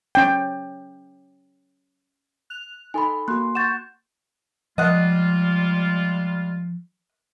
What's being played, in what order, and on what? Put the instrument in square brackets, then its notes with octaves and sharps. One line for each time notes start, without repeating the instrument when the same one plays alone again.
[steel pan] C#4 G5
[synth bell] F#6 F7
[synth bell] D#4 A4 C6 [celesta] G#5 B5
[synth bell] A#3 F#4 [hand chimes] C6 F#6
[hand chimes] F#5 C#6 G6 [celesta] A6 E7
[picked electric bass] F3 [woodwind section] G3 G#3 F4 [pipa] D#5 F#5